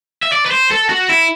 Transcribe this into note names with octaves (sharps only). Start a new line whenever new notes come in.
E5
D5
B4
C5
A4
F#4
E4